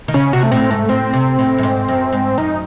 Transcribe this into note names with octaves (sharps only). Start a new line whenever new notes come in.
D#3
C#3 C#4
C3 F#4
A3
A2 C4
G#2 A3
A2 C4
C3
A2
F#2
G#2
F#2
G#2
F#2 D#4